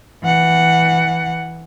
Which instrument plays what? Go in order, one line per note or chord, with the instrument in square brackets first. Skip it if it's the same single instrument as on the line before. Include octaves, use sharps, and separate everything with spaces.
[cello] E3 F#5